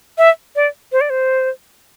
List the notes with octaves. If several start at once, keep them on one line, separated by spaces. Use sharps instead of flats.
E5
D5
C5
D5
C5